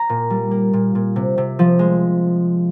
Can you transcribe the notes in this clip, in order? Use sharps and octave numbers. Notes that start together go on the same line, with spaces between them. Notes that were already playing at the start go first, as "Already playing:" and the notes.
Already playing: A#5
A#2
G3
A#3
A#2
A#2
C3
C3
F3
G#3